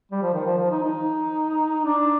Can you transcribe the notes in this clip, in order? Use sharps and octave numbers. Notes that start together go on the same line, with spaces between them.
G3
F3
D#3
F3
F3
D#4
D#4
D4